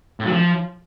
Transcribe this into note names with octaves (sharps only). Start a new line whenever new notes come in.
A2
F#3
F3